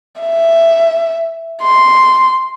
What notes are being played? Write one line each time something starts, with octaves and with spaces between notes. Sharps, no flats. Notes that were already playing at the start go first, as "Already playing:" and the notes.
E5
C6